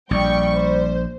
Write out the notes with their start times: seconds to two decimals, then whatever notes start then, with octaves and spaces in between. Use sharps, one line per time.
0.11 A#1 G3 G5 C#6
0.56 C5